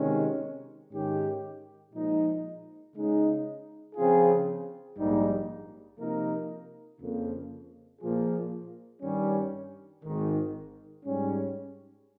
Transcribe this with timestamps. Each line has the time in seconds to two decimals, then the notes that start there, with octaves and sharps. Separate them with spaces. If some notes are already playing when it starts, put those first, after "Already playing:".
Already playing: C3 D#3 G#3 C#4
0.92 G#2 D#3 G#3 C#4 G4
1.93 A#2 F3 G#3 D#4
2.94 C#3 G#3 D#4
3.96 C#3 F3 C4 F4 G#4
4.97 A#1 G#2 G3 A#3 D#4
5.99 C3 F3 A#3 D#4 A#4
7.00 F2 C#3 F3 A#3
8.01 A#2 F3 A#3 F4 G#4
9.02 G2 D#3 G3 C#4
10.04 G#1 G#2 D#3
11.05 G#2 G3 C#4